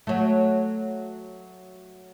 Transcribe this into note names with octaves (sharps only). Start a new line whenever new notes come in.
F#3 A3